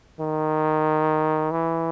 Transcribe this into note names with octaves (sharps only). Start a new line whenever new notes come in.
D#3
E3